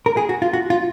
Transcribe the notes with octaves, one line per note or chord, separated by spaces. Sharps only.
A#4
G#4
F#4
F4
F#4
F4